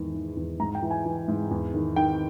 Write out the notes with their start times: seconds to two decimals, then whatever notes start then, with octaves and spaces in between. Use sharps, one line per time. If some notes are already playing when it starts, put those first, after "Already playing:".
Already playing: E2 G#2 D#3
0.14 D#3
0.37 E2
0.60 G#2 A#5
0.75 G5
0.82 E3
0.91 G#5
1.06 E3
1.28 G#2
1.51 E2
1.74 D#3
1.96 D#3 G5